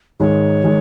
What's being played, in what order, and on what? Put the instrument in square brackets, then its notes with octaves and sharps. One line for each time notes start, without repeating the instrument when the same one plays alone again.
[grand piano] G#2 D#3 G#3 [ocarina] C#5
[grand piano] D#3 G#3